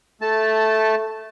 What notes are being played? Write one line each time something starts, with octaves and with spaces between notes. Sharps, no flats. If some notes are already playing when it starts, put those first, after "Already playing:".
A3 A5